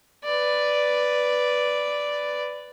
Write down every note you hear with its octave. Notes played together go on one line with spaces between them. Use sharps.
B4 D5